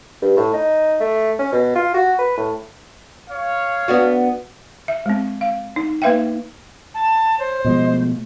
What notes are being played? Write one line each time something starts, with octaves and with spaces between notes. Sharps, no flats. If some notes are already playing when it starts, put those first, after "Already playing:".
G2
A2
D#4
A3
C#4
B2
F4
F#4
B4
A2
C#5 F5
B3 D4 F#4
E5
G#3 C4
F5
D#4
A#3 D#4 B4 E5 F5 G5
A5
C5 C#5
B2 F3 G#3 D#5
A3